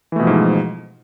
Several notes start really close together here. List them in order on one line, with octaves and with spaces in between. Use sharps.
E3 A3 B2 F3 G#2